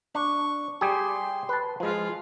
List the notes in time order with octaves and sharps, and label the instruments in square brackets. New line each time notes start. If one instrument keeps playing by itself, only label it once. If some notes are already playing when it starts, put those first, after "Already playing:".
[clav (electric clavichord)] D4 [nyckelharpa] C#6
[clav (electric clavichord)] G3 G4 G#4 [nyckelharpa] C6
[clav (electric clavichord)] B4 A5
[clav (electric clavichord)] F3 G#3 [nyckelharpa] F4 G#4